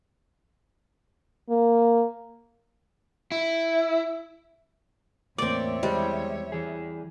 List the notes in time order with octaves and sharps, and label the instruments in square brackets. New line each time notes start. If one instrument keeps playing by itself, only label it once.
[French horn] A#3
[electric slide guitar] E4
[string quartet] E2 C#5 E5 [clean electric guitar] A2 A#3 [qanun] C4 D5 [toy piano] D6
[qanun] G3 [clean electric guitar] G#3 [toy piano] E4 C5 D#5
[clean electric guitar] E3 G#4